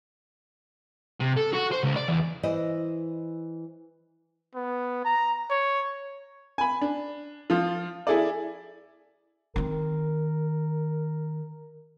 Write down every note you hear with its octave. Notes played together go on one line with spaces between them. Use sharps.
C3
A4
F#4
C5
C#2
D5
E2
E3 E4 C5 D#5
B3
A#5
C#5
G#5 B5
D4
F3 F4
E4 G#4 A4 D5
D#3 C4 A#4